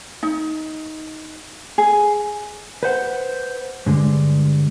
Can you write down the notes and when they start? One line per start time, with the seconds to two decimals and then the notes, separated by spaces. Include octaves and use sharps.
0.23 D#4
1.78 G#4
2.83 B4 C5 F#5
3.86 G2 D3 G#3